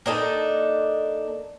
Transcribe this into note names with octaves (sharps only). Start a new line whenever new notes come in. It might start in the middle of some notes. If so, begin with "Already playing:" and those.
A#3 D4 D#4 A4